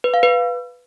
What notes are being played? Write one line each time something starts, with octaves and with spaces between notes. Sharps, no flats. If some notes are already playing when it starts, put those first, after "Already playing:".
B4
F5
B4